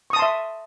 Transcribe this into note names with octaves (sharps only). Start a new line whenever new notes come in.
E5 A5 C6 C#6 D#6